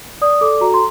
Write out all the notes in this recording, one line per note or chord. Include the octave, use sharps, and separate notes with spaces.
D5 D#6
A4 D6
F#4 A#5
C6